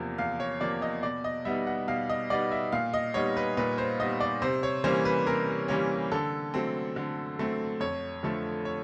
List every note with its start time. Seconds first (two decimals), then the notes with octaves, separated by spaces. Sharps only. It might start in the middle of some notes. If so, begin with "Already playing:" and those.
Already playing: E2 C3 F3 A#3
0.18 E2 F5
0.40 C#5
0.61 C3 F3 A#3 D5
0.82 D#5
1.03 B2 D5
1.24 D#5
1.45 G3 B3 D#4 E5
1.67 F#5
1.88 B2 F5
2.10 D#5
2.30 G3 B3 D#4 D5
2.52 E5
2.72 A#2 F5
2.94 D#5
3.14 G3 B3 D#4 C#5
3.37 B4
3.57 A#2 B4
3.78 C5
4.00 G3 B3 D#4 D#5
4.20 D5
4.42 C3 C5
4.63 C#5
4.84 E3 G3 A#3 C#4 C5
5.05 B4
5.27 C3 A#4
5.68 E3 G3 A#3 C#4
6.12 D3 A4
6.54 F#3 A3 C4
6.96 D3
7.39 F#3 A3 C4
7.80 F2 C#5
8.23 D3 F3 A3
8.65 C#5